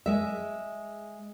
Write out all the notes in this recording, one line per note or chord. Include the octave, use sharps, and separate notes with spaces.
G#3 E5